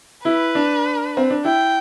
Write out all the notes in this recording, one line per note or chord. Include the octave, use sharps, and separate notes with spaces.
E4 B4
D4
C4
D4
E4 G5